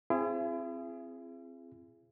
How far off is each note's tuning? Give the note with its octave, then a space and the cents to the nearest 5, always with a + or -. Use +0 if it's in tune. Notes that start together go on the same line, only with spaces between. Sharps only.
C4 +0 E4 +45 G#4 +0